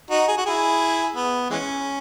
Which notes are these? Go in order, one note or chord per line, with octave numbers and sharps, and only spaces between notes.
D#4 F#4
G#4
F#4
E4 G#4
B3
E3 G#3 C#4